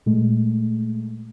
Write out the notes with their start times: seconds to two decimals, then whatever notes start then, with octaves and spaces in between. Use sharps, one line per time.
0.06 A#2 G#3 A3